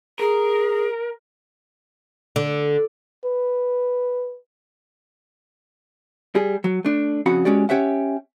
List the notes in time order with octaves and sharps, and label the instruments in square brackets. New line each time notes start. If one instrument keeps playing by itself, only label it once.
[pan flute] G#4 [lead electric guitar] A#4
[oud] D3
[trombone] B4
[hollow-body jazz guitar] G3 G#4
F#3
A3 D4
F2 C#3 F#4 F#5 B5
G#3 C#4 F#4 G4 D5
C#4 G4 C#5 E5 F#5